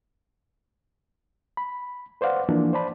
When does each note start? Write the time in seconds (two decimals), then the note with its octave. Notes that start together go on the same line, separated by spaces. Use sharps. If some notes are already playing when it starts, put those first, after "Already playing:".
1.57 B5
2.21 B4 C5 D5 F5 F#5
2.49 E3 F3 A#3 D4
2.73 C5 D5 A5 B5